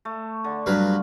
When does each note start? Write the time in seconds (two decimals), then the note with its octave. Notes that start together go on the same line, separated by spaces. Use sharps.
0.05 A3
0.44 D3
0.66 G2 F#3 B4 F5